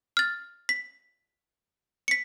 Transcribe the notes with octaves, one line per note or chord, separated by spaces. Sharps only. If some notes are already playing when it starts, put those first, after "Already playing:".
F6 A6
B6
B6 C#7